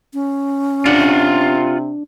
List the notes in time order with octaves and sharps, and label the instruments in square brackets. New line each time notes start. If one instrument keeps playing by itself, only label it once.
[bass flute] C#4
[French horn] C3 [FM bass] D4 [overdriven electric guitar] F4 F#5